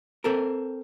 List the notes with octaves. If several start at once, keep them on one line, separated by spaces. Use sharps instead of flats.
C4 A4 A#4